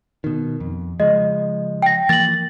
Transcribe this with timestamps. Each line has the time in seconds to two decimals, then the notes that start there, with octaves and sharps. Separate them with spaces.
0.24 B2 D#3
0.60 F2
1.00 C#3 F3 G#3 D#5
1.82 G5 A#6
2.09 E3 F3 A#3 A6 F#7